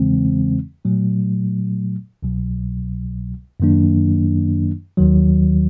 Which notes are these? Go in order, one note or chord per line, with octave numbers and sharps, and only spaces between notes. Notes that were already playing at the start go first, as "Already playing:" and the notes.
Already playing: E2 C#3 E3 G#3 C4
A#2 F#3 A3
C2 B2 F#3
F#2 D#3 F#3 A#3 D4
D#2 D#3 F#3